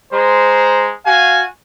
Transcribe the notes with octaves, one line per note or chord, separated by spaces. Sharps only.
G#3 C5 A#5
F#4 F5 G#5